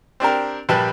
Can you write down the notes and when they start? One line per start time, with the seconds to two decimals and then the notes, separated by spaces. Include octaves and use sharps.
0.20 C4 D4 G4 A#4
0.69 A#1 G3 G4 B4 G5 A5